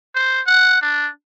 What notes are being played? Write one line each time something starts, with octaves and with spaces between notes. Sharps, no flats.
C5
F#5
D4